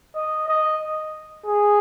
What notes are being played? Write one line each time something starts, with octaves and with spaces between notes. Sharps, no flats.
D#5
D#5
G#4